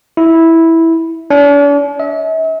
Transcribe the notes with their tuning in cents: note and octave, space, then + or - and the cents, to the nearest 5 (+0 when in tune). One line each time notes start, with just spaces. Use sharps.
E4 -5
D4 -45
E5 -45